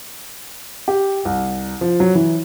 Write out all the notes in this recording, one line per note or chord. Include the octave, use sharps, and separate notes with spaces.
G4
C2
F3
F#3
E3